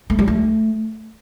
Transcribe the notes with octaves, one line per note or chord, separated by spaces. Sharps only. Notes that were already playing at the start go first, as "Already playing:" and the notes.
A3
G3
A3